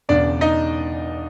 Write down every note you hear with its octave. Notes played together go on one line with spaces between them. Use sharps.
E1 E2 C#3 D4 D5
D#4 D#5